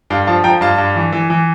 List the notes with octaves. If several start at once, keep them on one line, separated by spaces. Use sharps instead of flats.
G2 F5 A5
F3 F5 A5
F3 G5 A#5
G2 F5 A5
G2
E3
E3
E3